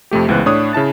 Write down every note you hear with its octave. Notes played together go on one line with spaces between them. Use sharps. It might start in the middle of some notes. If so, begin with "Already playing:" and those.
F2 C3 A3 G4
C#2 E3 B3 C5 F#6
A2 D4 C#5 D#6
C#3 E4 A5 A6